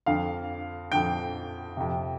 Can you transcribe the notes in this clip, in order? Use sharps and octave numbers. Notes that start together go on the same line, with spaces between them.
F2 D3 F5
F2 D3 G5
F2 C3